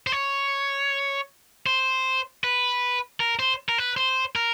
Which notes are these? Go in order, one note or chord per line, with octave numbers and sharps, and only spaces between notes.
C5
C#5
C5
B4
A#4
C5
A#4
B4
C5
A#4